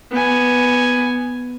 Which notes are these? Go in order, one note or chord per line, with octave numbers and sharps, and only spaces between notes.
B3 G#5